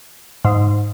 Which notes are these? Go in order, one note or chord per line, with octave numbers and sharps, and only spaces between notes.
G#2